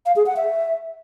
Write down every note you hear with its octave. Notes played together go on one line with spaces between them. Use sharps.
F5
G#4
F#5
E5